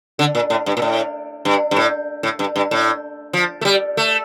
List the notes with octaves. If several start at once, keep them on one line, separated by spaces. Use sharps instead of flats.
D3
A#2
A2
G2
A#2
A2
G2
G2
A2
A2
G2
G2
A2
F3
A3
G3
A3